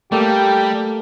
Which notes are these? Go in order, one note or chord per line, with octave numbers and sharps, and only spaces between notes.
G3 A3 A#3 G4 A4